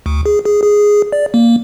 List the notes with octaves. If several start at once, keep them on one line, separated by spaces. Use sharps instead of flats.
D2
G#4
G#4
G#4
D5
A#3